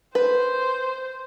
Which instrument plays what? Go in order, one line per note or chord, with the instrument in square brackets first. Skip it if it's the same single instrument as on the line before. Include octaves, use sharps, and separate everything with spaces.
[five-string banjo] B4 [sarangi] C5